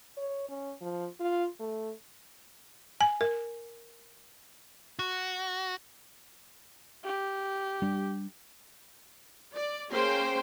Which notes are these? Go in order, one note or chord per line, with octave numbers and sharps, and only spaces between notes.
C#5
C#4
F3
F4
A3
G#5
A#4
F#4
G4
G3 D4
D5
A#3 C#4 G#4 C5 G5 C6